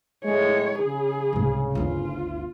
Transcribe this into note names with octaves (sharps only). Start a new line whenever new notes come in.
A2 G#3 C#5
C#3 G#4
C2 G#2
G1 D2 F4